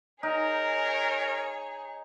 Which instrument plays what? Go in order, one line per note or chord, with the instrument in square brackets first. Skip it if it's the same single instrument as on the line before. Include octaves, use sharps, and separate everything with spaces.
[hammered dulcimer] D#4 G#5 [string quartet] G#4 C#5 [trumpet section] A#4